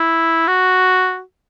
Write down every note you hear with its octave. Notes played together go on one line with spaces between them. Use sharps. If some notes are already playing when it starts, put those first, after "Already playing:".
Already playing: E4
F#4